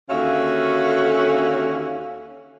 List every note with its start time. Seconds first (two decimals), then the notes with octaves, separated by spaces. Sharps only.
0.10 D#2 D3 C#4 F#4 E5 F5